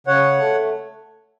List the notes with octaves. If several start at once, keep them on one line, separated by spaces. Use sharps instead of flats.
C#3 C#5 F#5
A3